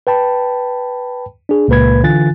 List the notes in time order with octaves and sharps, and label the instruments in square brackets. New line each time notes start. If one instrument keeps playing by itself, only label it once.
[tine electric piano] B4 G5 A5 B5
D4 G#4
C#2 A#2 A#3 B4 B5 G#6
D3 E3 F4 G#5 F#6 A6